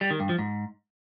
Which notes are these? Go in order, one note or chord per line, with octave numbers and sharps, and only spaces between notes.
G3
D#3
G2
F3
G#2